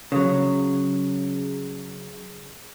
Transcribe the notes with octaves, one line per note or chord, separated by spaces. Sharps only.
C#3 F#3